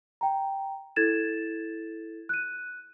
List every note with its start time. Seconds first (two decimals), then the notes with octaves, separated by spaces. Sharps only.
0.21 G5 A#5
0.96 E4 A4 G#6 A6 E7
2.29 F#6 D#7